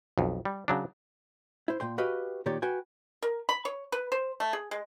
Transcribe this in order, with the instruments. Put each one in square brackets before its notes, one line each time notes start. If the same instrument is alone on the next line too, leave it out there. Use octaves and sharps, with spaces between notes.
[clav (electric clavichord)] B1 F2
G3
C#3 F#3 D4
[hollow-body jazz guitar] E4 C5
A#2 G5 C6
F#4 G4 B4 D#5 F5 G5
A#2 D#3 G4 C#5 D5
F#4 B4 G5 G#5
[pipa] A#4
B5
C#5
B4
C5
A3
G#4
G#3